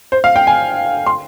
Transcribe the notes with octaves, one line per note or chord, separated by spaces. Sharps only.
C5
F5
G5
G#5
C6